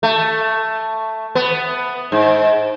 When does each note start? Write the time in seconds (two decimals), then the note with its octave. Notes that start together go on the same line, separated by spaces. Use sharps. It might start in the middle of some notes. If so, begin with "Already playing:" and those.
0.03 A3
1.35 B3
2.12 G#2